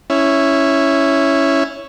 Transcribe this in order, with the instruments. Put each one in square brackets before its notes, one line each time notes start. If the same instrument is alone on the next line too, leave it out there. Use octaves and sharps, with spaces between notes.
[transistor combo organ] C#4 E4